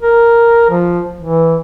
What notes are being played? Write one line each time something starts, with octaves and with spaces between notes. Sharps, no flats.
A#4
F3
E3